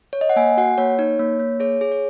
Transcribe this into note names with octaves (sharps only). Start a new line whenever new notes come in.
C#5
D#5
F#5
A#3 G#5
F#4 F#5
A#3 C#5
D#4 C#5
A#3
A#3
G#4 C#5
G#4
C#5